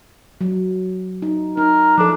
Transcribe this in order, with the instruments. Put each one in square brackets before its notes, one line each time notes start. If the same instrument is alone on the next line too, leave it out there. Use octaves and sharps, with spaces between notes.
[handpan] F#3
D#4
[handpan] D#4 [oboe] A#4
[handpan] F3 A4 [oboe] D4